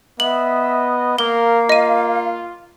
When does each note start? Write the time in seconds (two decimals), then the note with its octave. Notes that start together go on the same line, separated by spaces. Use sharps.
0.20 B3 D#5 E5 F#7
1.18 A#3 A#4 F5 G7
1.69 F4 D#5 D#7